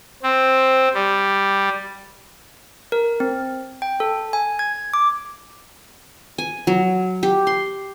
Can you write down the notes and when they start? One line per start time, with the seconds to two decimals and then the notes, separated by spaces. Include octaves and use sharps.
0.22 C4
0.94 G3
2.92 A#4
3.20 C4
3.82 G5
4.00 A4
4.33 G#5
4.59 G#6
4.94 D6
6.38 G#5
6.67 F#3
7.23 G4
7.47 C6